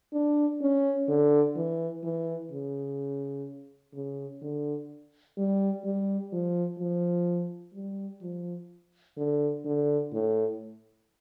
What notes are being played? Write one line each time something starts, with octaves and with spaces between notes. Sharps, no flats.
D4
C#4
D3
E3
E3
C#3
C#3
D3
G3
G3
F3
F3
G3
F3
D3
D3
A2